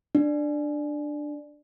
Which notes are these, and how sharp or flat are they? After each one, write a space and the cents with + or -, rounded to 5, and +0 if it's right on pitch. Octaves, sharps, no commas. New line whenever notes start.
D4 +10